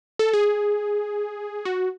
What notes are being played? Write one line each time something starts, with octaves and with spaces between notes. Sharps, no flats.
A4
G#4
F#4